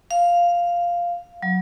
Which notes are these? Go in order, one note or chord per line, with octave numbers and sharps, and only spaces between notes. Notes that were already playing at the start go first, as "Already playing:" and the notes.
F5
F#3